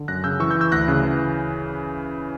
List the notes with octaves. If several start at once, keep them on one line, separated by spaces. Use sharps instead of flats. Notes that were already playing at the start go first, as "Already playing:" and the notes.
Already playing: D3
F#2 F#6 A#6
C#3 E6 G6
E3 C#6 E6
E6 G6
E3
E6 G6
D2 F#6 A#6
C#3
E3